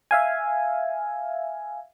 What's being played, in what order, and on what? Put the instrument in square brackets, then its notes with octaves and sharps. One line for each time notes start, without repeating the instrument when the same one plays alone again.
[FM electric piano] E5 F5 G#5